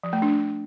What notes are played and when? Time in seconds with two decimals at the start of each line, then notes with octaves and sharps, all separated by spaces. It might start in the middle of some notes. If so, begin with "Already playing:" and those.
0.03 F3
0.13 A3
0.22 D4